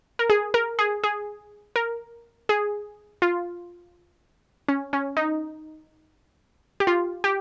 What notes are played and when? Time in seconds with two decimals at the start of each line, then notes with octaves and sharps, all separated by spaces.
0.19 A#4
0.30 G#4
0.54 A#4
0.79 G#4
1.04 G#4
1.76 A#4
2.49 G#4
3.22 F4
4.68 C#4
4.93 C#4
5.17 D#4
6.80 G4
6.87 F4
7.24 G4